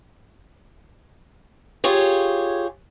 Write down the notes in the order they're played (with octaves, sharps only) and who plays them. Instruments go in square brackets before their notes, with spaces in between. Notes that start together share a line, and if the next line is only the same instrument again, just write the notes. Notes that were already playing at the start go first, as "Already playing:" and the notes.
[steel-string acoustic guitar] F4 G4 G#4 C#5